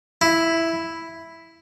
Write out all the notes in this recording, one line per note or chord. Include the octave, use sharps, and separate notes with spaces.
E4